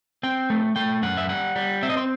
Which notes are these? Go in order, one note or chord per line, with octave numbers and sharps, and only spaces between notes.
C4 G5
A3
A3 G5
F#2 F#5
E5
G3 F#5
G3
C4 E5
D#5
C5